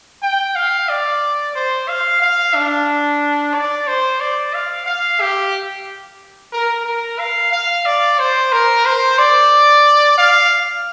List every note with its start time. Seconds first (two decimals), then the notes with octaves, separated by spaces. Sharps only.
0.22 G5
0.56 F5
0.89 D5
1.55 C5
1.88 F5
2.22 F5
2.54 D4
3.54 D5
3.87 C5
4.21 D5
4.54 F5
4.86 F5
5.21 G4
6.53 A#4
6.85 A#4
7.19 F5
7.52 F5
7.86 D5
8.19 C5
8.52 A#4
8.85 C5
9.19 D5
10.18 F5